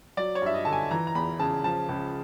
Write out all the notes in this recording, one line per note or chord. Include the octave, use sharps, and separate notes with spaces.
F#3 D5
C#5
G2 E5
D#5
D3 A5
G#5
E3 A#5
A#5
E2 B5
C#3 A5
F3 A5
C#2